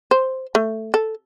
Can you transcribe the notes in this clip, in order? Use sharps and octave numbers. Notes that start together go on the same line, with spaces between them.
C5
A3
A4